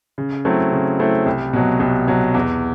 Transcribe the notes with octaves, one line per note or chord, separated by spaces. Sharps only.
C#3
F#3 A3 C4 E4
C#3
F#3 A3 C4 E4
C2
B2 F#3
C2
B2 F#3
E2